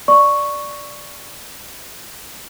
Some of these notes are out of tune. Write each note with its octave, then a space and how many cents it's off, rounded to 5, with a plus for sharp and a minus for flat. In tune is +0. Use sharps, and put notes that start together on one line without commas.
D5 +0 C#6 +0